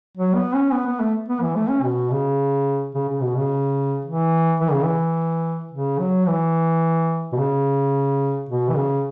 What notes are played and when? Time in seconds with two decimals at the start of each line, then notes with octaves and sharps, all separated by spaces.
0.17 F#3
0.35 B3
0.54 C#4
0.72 B3
0.87 B3
1.00 A3
1.29 B3
1.42 E3
1.56 A3
1.69 C#4
1.83 B2
2.11 C#3
2.95 C#3
3.08 C#3
3.22 B2
3.36 C#3
4.05 E3
4.60 E3
4.72 C#3
4.83 E3
5.72 C#3
5.99 F#3
6.27 E3
7.33 B2
7.38 C#3
8.49 B2
8.69 E3
8.77 C#3